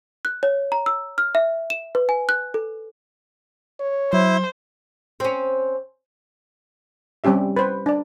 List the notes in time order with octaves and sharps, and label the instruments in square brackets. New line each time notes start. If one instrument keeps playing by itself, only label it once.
[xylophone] F#6
C#5
A#5
E6
F6
E5
E7
B4
G#5
F#6
A4
[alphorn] C#5
[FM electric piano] F#3 [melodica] E4 [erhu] C5
[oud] C4 C#4
[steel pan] G3 C4 C#4 G4 E5
B4 C5
D4 D5